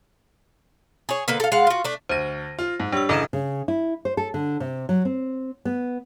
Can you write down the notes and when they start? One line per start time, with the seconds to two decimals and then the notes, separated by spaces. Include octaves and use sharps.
1.09 G#4 C#5
1.28 D3 A#3 B4
1.40 A4 F5
1.52 G#3 F5 F#5
1.67 F4 F#4
1.84 A3 D4
2.09 D2 C5 A#6 D#7
2.59 F4
2.80 G#2
2.92 G3 D4 C#5 E6
3.09 A1 C#3 A4 D#5 A#5 E7
3.33 C#3
3.68 E4
4.05 C5
4.17 A4
4.34 D3
4.60 C3
4.89 F#3
5.05 C4
5.65 B3